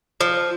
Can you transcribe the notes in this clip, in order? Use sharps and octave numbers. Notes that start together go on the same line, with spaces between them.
F3